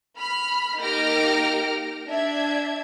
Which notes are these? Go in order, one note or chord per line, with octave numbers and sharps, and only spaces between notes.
B5 F6
A#3 D#4 G4 F6 A#6 D7
D4 E5 G#6